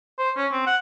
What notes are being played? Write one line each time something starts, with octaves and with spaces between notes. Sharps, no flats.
C5
C#4
C4
F#5